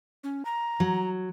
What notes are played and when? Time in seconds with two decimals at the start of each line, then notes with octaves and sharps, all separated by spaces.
0.24 C#4
0.45 A#5
0.80 F#3